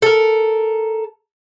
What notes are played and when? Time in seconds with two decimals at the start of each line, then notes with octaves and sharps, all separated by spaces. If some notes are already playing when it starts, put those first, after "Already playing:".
0.02 A4 A#4